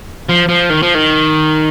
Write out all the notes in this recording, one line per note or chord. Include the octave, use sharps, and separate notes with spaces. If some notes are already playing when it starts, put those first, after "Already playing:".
F3
F3
D#3
F3
D#3